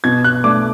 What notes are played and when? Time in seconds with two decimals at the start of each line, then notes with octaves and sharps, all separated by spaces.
0.04 B2 G#6
0.24 F#6
0.44 A3 D4 D6